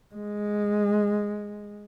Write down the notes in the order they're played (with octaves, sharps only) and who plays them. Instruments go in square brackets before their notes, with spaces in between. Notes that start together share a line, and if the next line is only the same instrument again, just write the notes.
[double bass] G#3